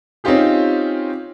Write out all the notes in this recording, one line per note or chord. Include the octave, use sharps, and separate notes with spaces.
C4 C#4 D#4 F4 G4 G#4